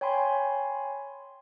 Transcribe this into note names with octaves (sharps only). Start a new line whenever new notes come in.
C#5 G5 G#5 B5 C6